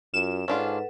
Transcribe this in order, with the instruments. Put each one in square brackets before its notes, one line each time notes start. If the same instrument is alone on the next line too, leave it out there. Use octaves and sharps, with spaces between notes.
[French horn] F#2 [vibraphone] F4 [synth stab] E7
[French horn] G#2 [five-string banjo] C#4 D4 F4 [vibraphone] A4 B4 F#5